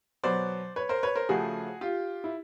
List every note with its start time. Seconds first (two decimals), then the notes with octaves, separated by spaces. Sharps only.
0.23 B2 F#3 B3 C5 D5
0.76 B4 C#5
0.89 A#4 C5
1.03 B4 C#5
1.16 A#4 C5
1.29 C#3 F3 A3 F#4 G#4
1.81 F4 G4
2.24 E4